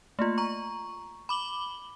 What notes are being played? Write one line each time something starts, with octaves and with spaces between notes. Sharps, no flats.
A3 A#3 F4
A#5 C#6
B5 D6 F#7 G7